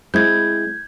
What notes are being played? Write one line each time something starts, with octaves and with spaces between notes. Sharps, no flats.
G#3 C4 E4 G6 G#6